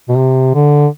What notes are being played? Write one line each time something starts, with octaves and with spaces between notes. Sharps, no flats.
B2
C3
D3